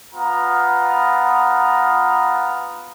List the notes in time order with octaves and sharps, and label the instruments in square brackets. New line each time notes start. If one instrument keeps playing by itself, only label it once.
[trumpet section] B3 F4 A#5